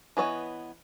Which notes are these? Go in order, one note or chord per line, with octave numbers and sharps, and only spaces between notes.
E3 B3 C#5 D#5